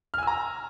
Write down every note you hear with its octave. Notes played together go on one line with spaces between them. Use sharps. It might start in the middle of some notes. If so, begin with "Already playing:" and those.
G#5 A#5 E6 F6